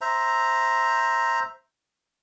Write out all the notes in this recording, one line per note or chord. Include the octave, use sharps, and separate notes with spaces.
C5 E5 A#5